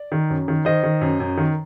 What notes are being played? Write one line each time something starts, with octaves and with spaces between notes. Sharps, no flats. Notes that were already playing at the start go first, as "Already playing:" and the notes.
Already playing: D5
D#3
F#2
D#3
D#3 C5 D#5
D#3
F#2
F#2
D#3